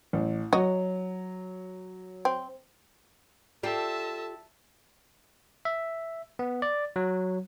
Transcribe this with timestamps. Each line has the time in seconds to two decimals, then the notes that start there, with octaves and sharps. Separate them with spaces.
0.13 A1
0.53 F#3 F#4 D#5
2.25 C4
3.63 F4 G4 A4 D5 E5 A5
5.65 E5
6.39 B3
6.62 D5
6.96 F#3